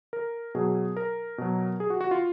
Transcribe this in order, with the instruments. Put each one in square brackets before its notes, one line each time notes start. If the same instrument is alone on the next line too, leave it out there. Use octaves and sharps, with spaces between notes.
[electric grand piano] A#4
B2 F#3 G#4
A#4
B2 F#3
G#4
F#4
F#4
F4